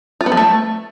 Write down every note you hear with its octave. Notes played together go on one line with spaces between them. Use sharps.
F4
B3
F3
A3